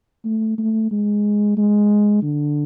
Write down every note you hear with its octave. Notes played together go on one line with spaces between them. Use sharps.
A3
A3
G#3
G#3
D3